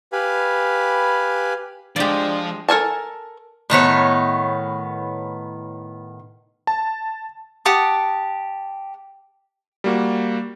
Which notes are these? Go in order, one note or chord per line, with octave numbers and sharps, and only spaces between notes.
G4 B4 F5 G#5 B5
F3 G#3 D4 G4 D5
A4 A#4 G#5 A5
A2 D#3 B3 C#5
A5
G4 F#5 A5 D#6
G3 A#3 F#4